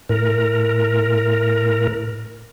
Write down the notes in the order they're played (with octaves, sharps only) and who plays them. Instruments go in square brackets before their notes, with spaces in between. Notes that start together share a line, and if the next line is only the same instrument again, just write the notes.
[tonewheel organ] A2 A#4